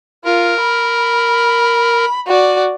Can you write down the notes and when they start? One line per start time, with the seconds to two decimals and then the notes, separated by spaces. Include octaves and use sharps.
0.25 F4 A#4
0.60 B5
2.27 F#4 D5